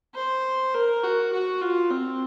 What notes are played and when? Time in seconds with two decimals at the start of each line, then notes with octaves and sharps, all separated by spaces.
0.15 C5
0.74 A#4
1.03 F#4
1.33 F#4
1.61 F4
1.90 C4